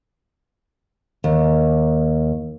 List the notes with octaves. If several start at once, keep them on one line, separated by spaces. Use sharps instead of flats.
D#2